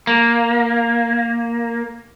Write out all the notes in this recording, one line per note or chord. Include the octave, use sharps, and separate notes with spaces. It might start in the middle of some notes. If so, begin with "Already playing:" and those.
A#3